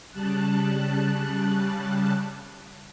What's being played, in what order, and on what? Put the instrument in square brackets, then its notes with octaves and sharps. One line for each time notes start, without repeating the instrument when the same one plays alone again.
[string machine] C#3 G3 A5 F#6